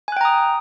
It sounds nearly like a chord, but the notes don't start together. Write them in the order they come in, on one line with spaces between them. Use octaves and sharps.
G#5 F#6 G5 A#5 D#6